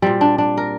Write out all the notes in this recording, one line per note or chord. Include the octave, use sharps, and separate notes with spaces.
A#2 G3 C4
D4
D4
A#4